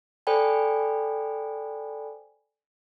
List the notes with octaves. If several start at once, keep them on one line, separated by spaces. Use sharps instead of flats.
A4 C5 D5 G5 G#5 B5